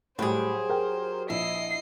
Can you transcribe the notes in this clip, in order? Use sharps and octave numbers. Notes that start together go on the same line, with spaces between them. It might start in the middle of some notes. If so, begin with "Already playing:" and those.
A2 F#3 G3 G4 G#4 C5
A#4 G5
A#1 E4 D#5 C7